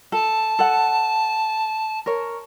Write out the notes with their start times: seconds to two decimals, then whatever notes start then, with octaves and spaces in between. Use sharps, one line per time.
0.12 A4 A5
0.59 A4 F#5
2.06 A#4 C#5